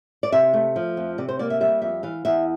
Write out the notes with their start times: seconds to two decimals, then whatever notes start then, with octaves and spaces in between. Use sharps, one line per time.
0.23 D5
0.32 C3 E5
0.53 A3
0.76 F3
0.97 F2
1.18 C3 D5
1.29 C5
1.39 A#3 D5
1.50 E5
1.61 G3 E5
1.82 F2 E5
2.03 E3 F5
2.25 E2 E5